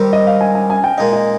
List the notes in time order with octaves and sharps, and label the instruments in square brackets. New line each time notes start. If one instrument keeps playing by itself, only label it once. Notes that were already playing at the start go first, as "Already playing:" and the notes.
Already playing: [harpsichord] D#3 G3 C4 G4
[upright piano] D#5
F5
G#5
G#5
G#5
G5
[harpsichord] A#2 G#3 D#4 [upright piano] D#5
[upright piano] D#5